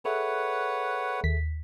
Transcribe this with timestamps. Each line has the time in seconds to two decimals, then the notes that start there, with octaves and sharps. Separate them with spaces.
0.05 G#4 A4 B4 C#5 E5 F#5
1.24 D#2 B6